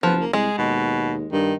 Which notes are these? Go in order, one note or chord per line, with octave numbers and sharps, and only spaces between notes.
F#1 F3 B3
A#3
C2 G#3 G#4
D#2 B2
G2 D#3